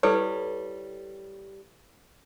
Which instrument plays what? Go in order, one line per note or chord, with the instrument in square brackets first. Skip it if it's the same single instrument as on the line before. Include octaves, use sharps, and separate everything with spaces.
[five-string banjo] G3 C#5 [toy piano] E4 A4 B4